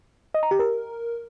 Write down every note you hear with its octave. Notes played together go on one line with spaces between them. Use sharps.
D#5
A#5
G4
A#4